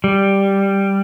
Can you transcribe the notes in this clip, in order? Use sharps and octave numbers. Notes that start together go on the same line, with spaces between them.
G3